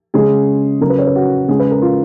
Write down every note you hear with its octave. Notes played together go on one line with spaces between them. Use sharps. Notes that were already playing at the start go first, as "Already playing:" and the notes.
C#3 G#3 C#4 G#4
C#3 F#3 C#4 A#4
B4
C#5
B4
F#4
C#3 G#3 C#4 G#4
B4
A#4
F4